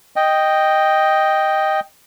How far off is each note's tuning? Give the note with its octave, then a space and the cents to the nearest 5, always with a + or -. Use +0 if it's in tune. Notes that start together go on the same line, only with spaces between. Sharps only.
D#5 +0 G5 +0